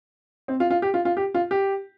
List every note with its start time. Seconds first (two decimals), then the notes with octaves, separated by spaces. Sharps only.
0.48 C4
0.60 F4
0.70 F4
0.82 G4
0.94 F4
1.05 F4
1.17 G4
1.34 F4
1.51 G4